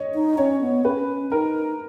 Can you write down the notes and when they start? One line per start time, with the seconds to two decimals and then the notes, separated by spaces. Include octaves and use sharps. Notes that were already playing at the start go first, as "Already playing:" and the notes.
Already playing: C#5 D#5
0.14 D#4
0.38 C#4 C#5
0.61 B3
0.85 C#4 B4
1.32 D#4 A#4